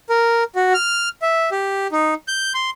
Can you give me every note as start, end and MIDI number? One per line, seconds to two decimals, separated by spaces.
0.10 0.44 70
0.56 0.73 66
0.74 1.09 89
1.22 1.50 76
1.52 1.87 67
1.92 2.14 63
2.28 2.53 91
2.55 2.70 84